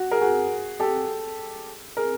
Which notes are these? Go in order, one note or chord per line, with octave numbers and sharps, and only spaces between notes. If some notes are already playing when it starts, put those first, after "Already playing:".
Already playing: F#4
G#4 A#4
F#4 G#4
G4 A4
G#4 A#4